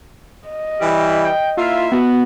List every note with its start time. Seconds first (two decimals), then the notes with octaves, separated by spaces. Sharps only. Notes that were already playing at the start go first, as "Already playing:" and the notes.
0.49 D#5
0.81 E3 G3
1.24 G5
1.57 A#3 E4 F4 E5
1.92 B3 F#4